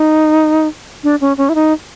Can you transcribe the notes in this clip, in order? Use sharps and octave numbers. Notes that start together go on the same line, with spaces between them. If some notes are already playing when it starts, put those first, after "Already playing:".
Already playing: D#4
D4
C#4
C#4
E4
D#4